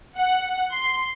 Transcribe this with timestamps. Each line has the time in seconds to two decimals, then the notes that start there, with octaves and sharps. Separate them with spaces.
0.17 F#5
0.73 C6